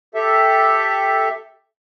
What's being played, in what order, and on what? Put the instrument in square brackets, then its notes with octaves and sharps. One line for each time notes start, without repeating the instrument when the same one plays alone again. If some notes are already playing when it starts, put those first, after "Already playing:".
[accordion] G4 A4 E5